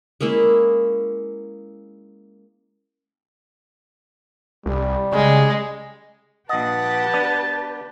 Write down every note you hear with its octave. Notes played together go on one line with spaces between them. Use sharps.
G#3 A#3 C#4 E4
C2 G3
C#3 G#3
A#1 G4 B4 D#5 F#5 A5
B3 D4 D5